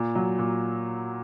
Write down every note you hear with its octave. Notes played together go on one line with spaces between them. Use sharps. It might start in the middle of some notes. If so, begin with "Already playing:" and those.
Already playing: A#2
F#3
A#2